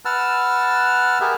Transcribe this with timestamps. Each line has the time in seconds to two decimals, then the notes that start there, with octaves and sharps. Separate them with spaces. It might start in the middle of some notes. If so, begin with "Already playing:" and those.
0.05 B4 F#5 A5 E6 F6
1.21 G4 G#4 A#4 B4 E5 F#5